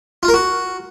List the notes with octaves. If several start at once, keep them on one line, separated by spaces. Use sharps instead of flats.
F4
A#4
F#4